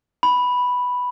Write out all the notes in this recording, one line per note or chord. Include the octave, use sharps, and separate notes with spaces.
B5